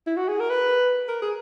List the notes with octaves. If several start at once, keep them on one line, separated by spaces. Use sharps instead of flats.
E4
F#4
G#4
A#4
B4
A#4
G#4